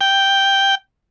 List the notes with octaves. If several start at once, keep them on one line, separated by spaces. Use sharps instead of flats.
G5